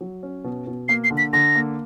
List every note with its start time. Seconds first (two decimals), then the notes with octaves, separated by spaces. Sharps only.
0.01 F#3
0.23 C#4
0.44 B2
0.67 B2
0.88 A#3 C7
1.04 C7
1.11 D3
1.18 B6
1.33 D3 A#6
1.55 A#3